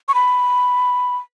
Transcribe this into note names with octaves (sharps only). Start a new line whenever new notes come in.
C#6
B5